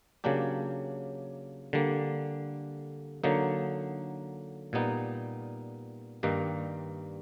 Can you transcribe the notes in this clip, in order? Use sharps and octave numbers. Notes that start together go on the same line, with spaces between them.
C#3 F#3 A#3 D4 G4
D3 G3 A#3
D3 F#3 A#3 D#4
A#2 G3 B3 D#4
G2 D#3 G3 A#3 D#4